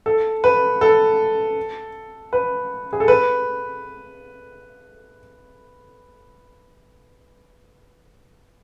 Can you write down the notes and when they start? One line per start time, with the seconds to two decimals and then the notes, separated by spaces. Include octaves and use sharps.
0.06 A4
0.44 B4
0.81 A4
2.33 B4
2.93 G#4
3.00 A4
3.08 B4